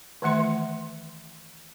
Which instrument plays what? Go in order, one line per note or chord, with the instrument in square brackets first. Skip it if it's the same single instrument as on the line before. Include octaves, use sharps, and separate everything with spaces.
[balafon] D#3 E3 A3 E5 C6